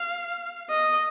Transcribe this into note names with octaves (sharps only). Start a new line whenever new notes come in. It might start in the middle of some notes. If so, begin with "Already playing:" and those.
Already playing: F5
D#5